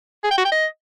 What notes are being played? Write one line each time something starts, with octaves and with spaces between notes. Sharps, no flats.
G#4
G5
F#4
G5
D#5